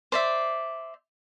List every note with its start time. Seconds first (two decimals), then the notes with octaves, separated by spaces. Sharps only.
0.12 C5 D5 E5